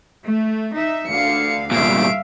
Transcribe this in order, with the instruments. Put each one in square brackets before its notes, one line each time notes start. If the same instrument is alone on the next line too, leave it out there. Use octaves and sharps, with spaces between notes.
[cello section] A3
D#4 E5
[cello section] D2 D3 F5 [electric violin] C#7
[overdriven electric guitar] C2 A#2 [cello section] G2 D3 F5 [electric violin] E5 D7